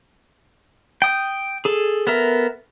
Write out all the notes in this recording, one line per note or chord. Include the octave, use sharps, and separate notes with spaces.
G5 D#6
G#4 A4
B3 A4 A#4 E5